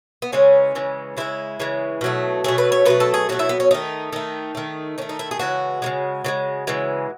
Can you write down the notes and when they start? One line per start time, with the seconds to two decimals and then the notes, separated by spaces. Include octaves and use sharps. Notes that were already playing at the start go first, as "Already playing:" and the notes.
0.22 B3
0.32 C#3 E3 G#3 C#4
0.75 C#3 E3 G#3
1.17 C#3 E3 G#3 E4
1.60 C#3 E3 G#3
2.01 B2 F#3 A3
2.44 B2 F#3 A3 G#4
2.58 B4
2.72 C#5
2.86 B2 F#3 A3 B4
3.00 A4
3.14 G#4
3.29 B2 F#3 A3 F#4
3.39 E4
3.49 B3
3.60 C#4
3.71 D#3 A3 D#4
4.12 D#3 A3 D#4
4.55 D#3 A3
4.98 D#3 C#4
5.02 A3
5.09 D#4
5.19 E4
5.31 G#4
5.39 C#3 E3 G#3 F#4
5.82 C#3 E3 G#3
6.24 C#3 E3 G#3
6.67 C#3 E3 G#3